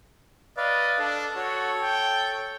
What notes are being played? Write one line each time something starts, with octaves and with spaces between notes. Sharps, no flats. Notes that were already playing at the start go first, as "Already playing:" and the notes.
B4 D5 D#5 F5
D4 A4
F#4 A4 C#5
G5